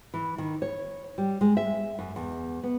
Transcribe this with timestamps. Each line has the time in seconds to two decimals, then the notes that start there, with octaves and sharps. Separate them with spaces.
0.14 E3
0.38 D#3
0.62 C#5
1.18 G3
1.41 G#3
1.57 E5
1.99 F#2
2.16 E2
2.63 B3